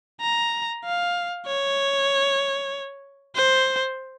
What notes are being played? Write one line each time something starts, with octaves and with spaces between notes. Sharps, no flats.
A#5
F5
C#5
C5